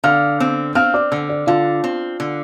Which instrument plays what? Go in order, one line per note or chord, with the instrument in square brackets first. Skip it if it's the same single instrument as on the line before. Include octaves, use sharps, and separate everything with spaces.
[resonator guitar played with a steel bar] D3 [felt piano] F5 F6
[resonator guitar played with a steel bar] C4
[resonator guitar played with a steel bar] C4 [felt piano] F5 F6
[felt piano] D5 D6
[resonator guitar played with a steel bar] D3
[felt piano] D5
[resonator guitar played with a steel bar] D3 [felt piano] F4 F5
[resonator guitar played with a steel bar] C4
D3